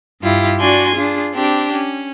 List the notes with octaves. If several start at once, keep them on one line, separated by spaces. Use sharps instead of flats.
G2 E4 F4 G4
D4 F#4 D5 G#5 C6
D4 F4 G#4
C4 D4 G4
C#4